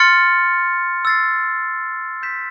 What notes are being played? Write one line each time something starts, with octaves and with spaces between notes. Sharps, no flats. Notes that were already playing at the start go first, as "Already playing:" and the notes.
Already playing: C6 F6 A6 C#7
E6 A6 C7
G6 B6 E7